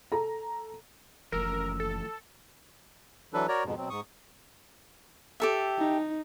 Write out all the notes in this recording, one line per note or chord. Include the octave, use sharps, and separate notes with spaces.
A4 A#5
F#1 E3 F3 A3 C#4 A#4 E6
A4
E3 F#3 D4 A4 B4
F#4 A#4 C#5 D5 A#5
F2 G#2 B2
B2 F#3 C4
G#2 C#6 D#6
G4 A4 E5
D#4